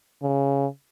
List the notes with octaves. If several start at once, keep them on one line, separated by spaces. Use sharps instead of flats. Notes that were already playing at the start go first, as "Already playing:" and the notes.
C#3